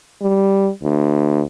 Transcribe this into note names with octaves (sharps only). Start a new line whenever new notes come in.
G3
D2